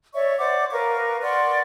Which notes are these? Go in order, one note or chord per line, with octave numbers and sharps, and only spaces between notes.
C#5 D5 E5 C#6
C5 D5 F#5 D6
A#4 B4 F5 C#6
D5 F#5 C6 C#6